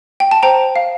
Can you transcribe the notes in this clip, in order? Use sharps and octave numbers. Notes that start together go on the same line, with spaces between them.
G5
A5
C5 G5 A#5
F5